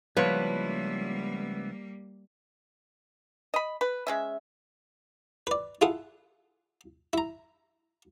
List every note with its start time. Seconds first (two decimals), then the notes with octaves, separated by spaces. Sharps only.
0.17 C#2 F3 G3 A#3 B3 E4 B4 C#5
3.54 D#5 B5
3.81 B4
4.07 G#3 C#4 E5
5.47 B4 D5
5.81 E4 F4 G#4 A4 F#5
7.13 E4 A#5